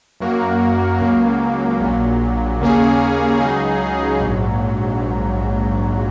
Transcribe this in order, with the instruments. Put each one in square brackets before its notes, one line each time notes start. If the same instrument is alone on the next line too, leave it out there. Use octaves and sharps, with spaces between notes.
[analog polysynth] F#2 F#3 A#3 F#4 A#4
C#2 C#3 F#3 A#3
A#1 A#2 F#3
D#2 C#3 A#3 C#4 G#4
C#2 C#3 F#3 D#4 G#4
A#1 G#2 F#3